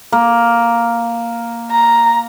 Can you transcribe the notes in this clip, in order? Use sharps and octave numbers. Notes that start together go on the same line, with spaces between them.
A#3
A#5